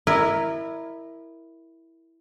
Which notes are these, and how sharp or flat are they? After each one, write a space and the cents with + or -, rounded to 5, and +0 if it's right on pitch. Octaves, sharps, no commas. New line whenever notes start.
E4 +0 A#4 +0 D#5 -40